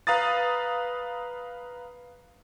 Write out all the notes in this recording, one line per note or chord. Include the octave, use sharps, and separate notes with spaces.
B4 F5 A#5 D#6 A6